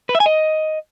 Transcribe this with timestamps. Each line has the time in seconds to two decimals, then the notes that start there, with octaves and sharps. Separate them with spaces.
0.09 B4
0.15 E5
0.20 G#5
0.26 D#5